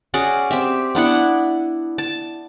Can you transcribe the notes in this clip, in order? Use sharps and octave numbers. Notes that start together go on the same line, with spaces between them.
C#4 F#4 G#4 D5
C4 G4 E5
B3 D4 E4 F#5
A5